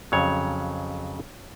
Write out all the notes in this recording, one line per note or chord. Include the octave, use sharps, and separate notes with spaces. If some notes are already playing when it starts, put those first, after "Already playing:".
F2 C#3 F#3 C#5